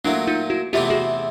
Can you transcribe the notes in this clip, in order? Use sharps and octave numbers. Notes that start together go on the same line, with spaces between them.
A#2 F#3 A3 D4 E4
D#4 F4
E4 F#4
E2 C3 E3 A3 D4 F4 G4
F#4 G#4